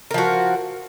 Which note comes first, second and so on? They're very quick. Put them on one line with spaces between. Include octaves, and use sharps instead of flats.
A#4 F3 F#4